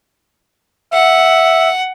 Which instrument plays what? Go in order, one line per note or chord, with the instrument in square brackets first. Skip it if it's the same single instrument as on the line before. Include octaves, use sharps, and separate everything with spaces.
[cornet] E5 [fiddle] F#5